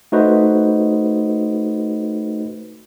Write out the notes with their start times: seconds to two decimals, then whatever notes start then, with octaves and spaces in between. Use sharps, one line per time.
0.12 A3 D#4 F#4 B4 C5 D#5